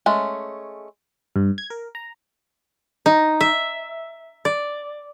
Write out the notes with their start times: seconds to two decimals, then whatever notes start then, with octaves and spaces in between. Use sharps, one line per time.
0.06 G#3 A3 C#4
1.36 G2
1.58 G#6
1.70 A#4
1.95 A#5
3.06 D#4
3.41 E5
4.45 D5